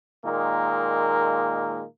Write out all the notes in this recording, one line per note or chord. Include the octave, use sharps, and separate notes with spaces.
A#2 D#3 G#3 A#3